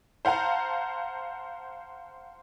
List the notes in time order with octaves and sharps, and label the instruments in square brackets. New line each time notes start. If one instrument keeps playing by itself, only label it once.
[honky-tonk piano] C5 F5 F#5 A5 A#5